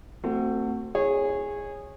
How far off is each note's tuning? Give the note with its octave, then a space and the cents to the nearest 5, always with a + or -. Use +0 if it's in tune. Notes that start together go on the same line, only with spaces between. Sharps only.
A3 +30 C4 +0 F#4 +0
E4 -25 G#4 -15 C#5 -20